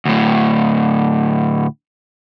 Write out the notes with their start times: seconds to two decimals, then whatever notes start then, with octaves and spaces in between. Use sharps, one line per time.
0.05 D2 A2